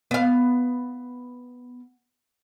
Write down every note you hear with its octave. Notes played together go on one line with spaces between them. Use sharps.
B3 F5